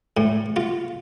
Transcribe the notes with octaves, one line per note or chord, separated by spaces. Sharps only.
A2
F4